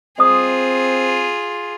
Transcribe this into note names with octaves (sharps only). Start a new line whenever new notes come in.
C4 F4 G#4 D#5 D#6